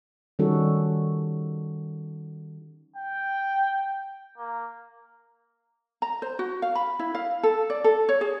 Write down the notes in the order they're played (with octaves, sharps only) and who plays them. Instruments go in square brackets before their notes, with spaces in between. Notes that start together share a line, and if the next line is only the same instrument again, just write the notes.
[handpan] D#3 G3 C#4 D#4 F#4 A4
[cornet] G5
A#3
[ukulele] A#5
C5
F#4
F5
B5
E4
F5
A4
D5
A4
C#5
G#4